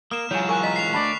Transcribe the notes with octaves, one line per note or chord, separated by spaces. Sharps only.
A#3 D#6 F6 E7
E3 F#3 G#3 F4 C#5 G#5
A#4 G#5 C#6 F#6
D#5 F#5 A#5 B6
C7 F7
D2 D5 F#5 A5 B5